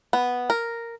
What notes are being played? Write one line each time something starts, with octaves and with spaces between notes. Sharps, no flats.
B3
A#4